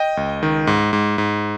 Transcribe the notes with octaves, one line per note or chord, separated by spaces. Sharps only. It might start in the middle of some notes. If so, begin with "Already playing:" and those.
Already playing: D#5 G5
C#2
D#3
G#2
G#2
G#2